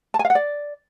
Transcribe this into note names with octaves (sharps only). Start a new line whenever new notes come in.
A5
G#5
F5
F#5
D5